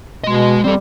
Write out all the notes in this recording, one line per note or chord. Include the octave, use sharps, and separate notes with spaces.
B2 G#3 D#5
G3 C4 A4